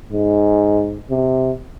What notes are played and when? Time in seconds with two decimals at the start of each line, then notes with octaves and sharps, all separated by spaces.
0.12 G#2
1.10 C3